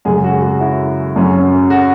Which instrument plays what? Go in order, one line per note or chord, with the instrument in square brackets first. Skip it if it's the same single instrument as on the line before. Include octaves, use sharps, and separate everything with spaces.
[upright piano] F#2 C#3 G#3 G#4
F#4
F#4
E4
F#2 F#3 C#4
F#4